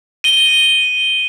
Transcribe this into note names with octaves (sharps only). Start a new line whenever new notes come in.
D#7 G7